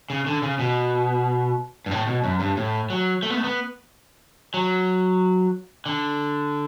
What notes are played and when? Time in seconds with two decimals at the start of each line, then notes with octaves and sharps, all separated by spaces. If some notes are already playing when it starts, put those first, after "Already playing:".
0.10 C#3
0.27 D3
0.43 C#3
0.59 B2
1.86 G2
1.91 A2
2.07 B2
2.24 F#2
2.40 G2
2.57 A2
2.90 F#3
3.23 A3
3.30 B3
3.37 A3
3.44 B3
4.54 F#3
5.86 D3